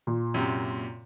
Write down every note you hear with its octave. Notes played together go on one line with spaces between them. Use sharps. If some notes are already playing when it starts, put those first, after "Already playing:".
A#2
F#2 C3